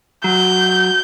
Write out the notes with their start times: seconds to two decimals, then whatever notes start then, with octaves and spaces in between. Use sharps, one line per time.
0.24 F#3 G6